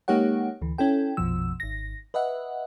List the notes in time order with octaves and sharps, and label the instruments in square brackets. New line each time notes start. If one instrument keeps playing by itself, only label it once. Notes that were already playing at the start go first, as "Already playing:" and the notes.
[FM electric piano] G#3 A#3 D#4 G4 C#5 F#5
D2 E3
C#4 E4 A4 G5
A#1 F2 B2 F3 E6
G#1 A#6
B4 D#5 E5 F#5